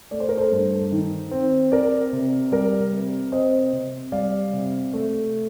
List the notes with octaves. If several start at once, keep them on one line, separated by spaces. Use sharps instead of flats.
A3 D5
C5
A#4
A4 C5
G2
D#3
C4
C4 A#4 D5
C3
G3 A#4 D5
C3
C4 C5 D#5
C3
G3 D5 F5
C3
A3